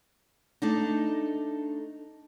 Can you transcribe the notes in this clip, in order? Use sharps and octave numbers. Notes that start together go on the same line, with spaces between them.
A3 D4 D#4